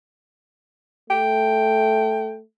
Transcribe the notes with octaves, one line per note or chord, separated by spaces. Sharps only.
A3 G5